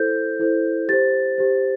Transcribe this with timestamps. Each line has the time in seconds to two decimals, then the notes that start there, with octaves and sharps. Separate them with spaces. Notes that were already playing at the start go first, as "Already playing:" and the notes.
Already playing: E4 A4 C5 G6
0.39 E4 A4 C5
0.89 G4 C5 A6
1.38 G4 C5